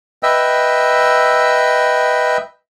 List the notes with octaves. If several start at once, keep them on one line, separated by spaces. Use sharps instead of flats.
B4 D#5 E5 G5 E6